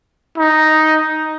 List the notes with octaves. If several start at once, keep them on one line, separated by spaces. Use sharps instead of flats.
D#4